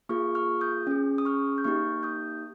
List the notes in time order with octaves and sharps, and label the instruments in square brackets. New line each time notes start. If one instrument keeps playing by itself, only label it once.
[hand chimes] A#3 F4 G#4 C#6 F6
C#6 F6
D#6 G6
C#4 G#4
D#6
C#6 F6
G6
A#3 D#4 G4 C#6 F6
D#6 G6